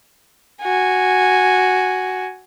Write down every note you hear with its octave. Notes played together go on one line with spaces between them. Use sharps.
F#4 G#5